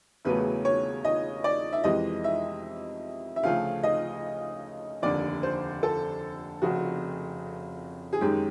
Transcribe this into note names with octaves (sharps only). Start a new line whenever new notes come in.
E1 E2 C#3 F#3 A3 B4
C#5
D#5
D5
E5
F2 C3 E3 G#3 D#5
E5
E5
D2 C#3 F3 A3 F5
D#5
F1 D#2 D3 D5
C5
A4
F1 F2 C#3 F#4
G#4
F#2 D#3 G#3 G4